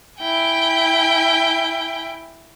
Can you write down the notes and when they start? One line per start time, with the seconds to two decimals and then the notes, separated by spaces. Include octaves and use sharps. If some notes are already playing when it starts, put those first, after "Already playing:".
0.20 E4 G5 G#5